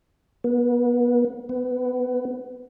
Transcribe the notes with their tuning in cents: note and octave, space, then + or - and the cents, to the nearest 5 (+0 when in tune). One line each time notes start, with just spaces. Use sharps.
B3 -30
B3 +20